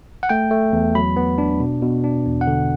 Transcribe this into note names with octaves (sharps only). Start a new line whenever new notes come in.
F#5
A3 G5
A3
E2
F#3 B5
B3
D4
B2
B2
D4
E2
F#5
D3